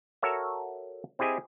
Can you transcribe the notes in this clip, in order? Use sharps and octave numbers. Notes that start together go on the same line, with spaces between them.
F#4 A4 A#4 C#5 E5
C4 E4 G4 G#4 D#5 G#5